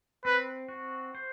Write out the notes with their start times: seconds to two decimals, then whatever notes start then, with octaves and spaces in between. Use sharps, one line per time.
0.25 C4 B4
0.69 F#4
1.15 C5